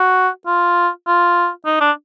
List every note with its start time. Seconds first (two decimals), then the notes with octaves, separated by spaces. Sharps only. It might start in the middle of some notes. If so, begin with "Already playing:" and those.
Already playing: F#4
0.46 F4
1.07 F4
1.65 D#4
1.81 D4